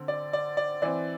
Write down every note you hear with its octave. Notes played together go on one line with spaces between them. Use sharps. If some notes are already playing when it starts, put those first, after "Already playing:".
Already playing: D3 C4
D5
D5
D5
E3 C4 D5